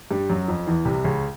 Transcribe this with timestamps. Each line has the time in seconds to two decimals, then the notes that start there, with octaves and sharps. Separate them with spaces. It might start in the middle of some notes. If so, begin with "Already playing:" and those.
0.11 G2 G3
0.29 F#2 F#3
0.48 F2 F3
0.67 E2 E3
0.85 C2 C3
1.04 C#2 C#3